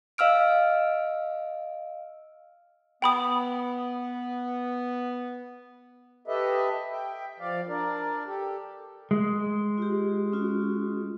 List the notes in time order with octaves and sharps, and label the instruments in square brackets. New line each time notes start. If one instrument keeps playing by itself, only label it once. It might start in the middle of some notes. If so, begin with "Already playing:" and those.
[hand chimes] D#5 F5 E6 F6 D7
[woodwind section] B3 [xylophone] G5 B5 D#6
[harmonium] G4 A4 B4 D#5 E5
E5 G5
F3 D5 F5
D4 A#4 D5
G4 A4
[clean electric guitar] G#3
[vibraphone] F4 G4
C#4 F4 F#4